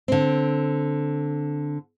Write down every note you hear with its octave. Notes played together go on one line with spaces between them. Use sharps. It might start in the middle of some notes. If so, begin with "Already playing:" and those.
D3 C4